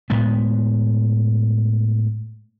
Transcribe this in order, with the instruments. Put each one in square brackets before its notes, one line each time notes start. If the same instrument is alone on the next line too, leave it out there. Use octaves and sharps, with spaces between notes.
[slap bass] A2 G#3 B3